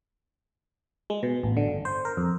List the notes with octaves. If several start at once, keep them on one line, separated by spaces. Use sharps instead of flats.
G#3
B2
A1
D3
G1
C5
A#4
F2